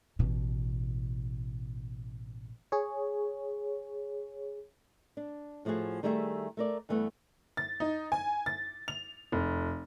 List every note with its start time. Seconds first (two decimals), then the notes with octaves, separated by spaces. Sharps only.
0.19 A1 B2
2.72 G#4 C#5
5.17 D4
5.65 A2 F3 A3 F#4 G#4
6.03 D#3 G3 A3 G#4 C5 E5
6.57 A3 A#4 D5
6.89 G2 E3 A3 B3 B4
7.57 A6
7.80 D#4
8.12 G#5
8.46 A6
8.88 F7
9.32 F1